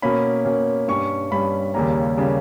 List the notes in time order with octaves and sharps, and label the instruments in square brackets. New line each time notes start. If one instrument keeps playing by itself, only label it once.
[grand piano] B2 A#3 C#4 B5
B2 A#3 C#4
G2 G3 C#4 C#6
G2 G3 C#4 B5
D#2 C#3 G3 A#3 C#4 A#5
C#3 G3 A#3 C#4